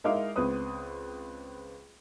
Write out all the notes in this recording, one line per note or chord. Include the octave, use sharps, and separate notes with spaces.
G#3 D#4 E4 A#4 F5 D6
C#2 B3 C4 B4 D#6